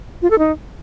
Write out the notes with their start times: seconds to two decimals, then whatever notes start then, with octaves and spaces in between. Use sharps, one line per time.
0.22 F4
0.30 A4
0.39 D#4